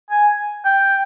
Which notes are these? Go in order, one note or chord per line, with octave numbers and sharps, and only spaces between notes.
G#5
G5